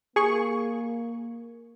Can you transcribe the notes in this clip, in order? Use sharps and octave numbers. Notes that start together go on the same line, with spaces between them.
A#3 G#4 C#6